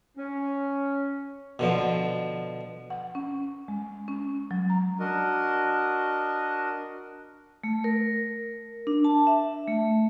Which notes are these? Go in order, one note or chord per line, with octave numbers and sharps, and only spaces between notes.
C#4
B2 D3 F3
F#5
C#4
G#3
C#4
F#3
A#5
D4 F#4 A#4 D#5
A3
A#4
D4
A5
E5
A3